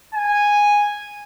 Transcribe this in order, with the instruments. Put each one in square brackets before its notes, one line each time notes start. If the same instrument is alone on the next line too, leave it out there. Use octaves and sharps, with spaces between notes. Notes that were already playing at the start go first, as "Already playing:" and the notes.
[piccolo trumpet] G#5